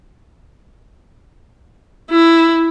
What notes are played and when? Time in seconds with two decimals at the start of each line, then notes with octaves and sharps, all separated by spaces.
2.10 E4